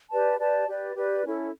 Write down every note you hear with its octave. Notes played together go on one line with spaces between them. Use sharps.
G4 B4 D5 A5
G4 B4 D5 A5
G4 B4 D5
G4 B4 D5
C#4 E4 A4